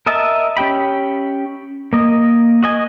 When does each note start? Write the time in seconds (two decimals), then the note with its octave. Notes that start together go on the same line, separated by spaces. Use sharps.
0.06 A#4 D#5 E5 A5
0.57 C#4 G4 G5 B5
1.93 A#3 D#5
2.63 F#4 D#5 G#5